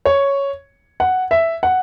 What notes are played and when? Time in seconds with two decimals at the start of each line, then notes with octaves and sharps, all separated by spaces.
0.05 C#5
1.00 F#5
1.31 E5
1.63 F#5